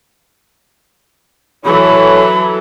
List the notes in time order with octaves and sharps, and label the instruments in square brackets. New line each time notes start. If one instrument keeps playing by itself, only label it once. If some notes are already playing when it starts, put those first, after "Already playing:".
[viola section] E3 F#3 A4 [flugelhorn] C#5 [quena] B5